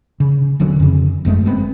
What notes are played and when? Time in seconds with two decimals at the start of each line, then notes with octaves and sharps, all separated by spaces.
0.20 C#3
0.60 E1 D3 F#3 C#4
0.80 F2 C#3
1.25 G1 F#2 G#3 A3
1.44 G1 G#3 B3 C4